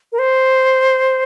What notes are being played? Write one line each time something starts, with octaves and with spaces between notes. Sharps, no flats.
A#4
C5